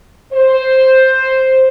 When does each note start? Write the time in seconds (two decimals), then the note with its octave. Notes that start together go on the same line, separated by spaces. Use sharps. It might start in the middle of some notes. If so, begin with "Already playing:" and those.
0.33 C5